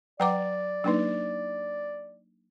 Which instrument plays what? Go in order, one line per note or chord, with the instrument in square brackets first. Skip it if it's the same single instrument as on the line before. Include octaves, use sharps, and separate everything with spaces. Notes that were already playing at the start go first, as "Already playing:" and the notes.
[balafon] F#3 A#5 D6 [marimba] B4 F#5 G5 [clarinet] D5
[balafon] F#3 A#3 D#4 [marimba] D4 B4